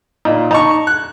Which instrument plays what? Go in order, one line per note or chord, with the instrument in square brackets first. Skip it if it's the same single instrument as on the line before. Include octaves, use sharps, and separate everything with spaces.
[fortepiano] A#2 [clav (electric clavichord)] D#4
[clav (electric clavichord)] D#4 [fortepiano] A5 A#5 C#6
[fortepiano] F#6